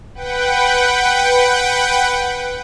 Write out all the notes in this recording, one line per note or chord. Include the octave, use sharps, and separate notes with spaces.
B4 F#5 G5